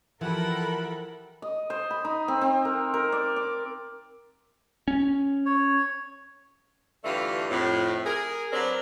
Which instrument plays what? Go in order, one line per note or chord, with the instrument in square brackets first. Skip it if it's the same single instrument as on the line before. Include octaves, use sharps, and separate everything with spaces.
[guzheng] E3 [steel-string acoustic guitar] F3 G4 [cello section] A4 A#4 [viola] F#5 B5
[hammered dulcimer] D#5
C5
B5
D#4
C4
C4
A#4
A#4
D5
D5
[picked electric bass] C#4
[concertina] C#5
[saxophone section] G2 D3 E3 A3 F4
F2 A2
G#4 A#4
F#3 C4 D4 A#4 B4